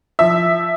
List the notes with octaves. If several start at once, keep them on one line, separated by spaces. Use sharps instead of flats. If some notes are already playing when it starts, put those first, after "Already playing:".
F3 E5